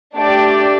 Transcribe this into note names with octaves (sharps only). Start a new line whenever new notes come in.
A3 D4 G4 D5